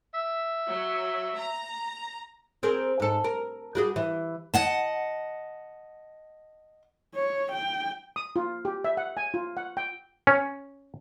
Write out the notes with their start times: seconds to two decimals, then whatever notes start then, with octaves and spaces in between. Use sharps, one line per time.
0.14 E5
0.67 F#3
1.37 A#5
2.63 C4 G#4 A#4
3.00 G#2 A4
3.24 A#4
3.75 G3 F#4 G#4
3.96 E3
4.54 D#5 F#5 A5
7.15 C#5
7.52 G5
8.16 D#6
8.36 F4
8.65 G4
8.84 E5
8.97 F#5
9.17 G#5
9.34 F4
9.57 F#5
9.77 G5
10.27 C#4